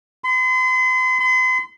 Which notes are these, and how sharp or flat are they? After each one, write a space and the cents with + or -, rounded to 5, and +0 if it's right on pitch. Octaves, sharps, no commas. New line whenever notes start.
C6 -40
C6 -40